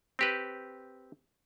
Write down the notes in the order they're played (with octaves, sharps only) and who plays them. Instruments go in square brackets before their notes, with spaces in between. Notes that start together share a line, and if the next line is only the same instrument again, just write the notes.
[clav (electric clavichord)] C4 G4 B4